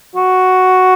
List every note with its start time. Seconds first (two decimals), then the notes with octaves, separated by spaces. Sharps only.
0.16 F#4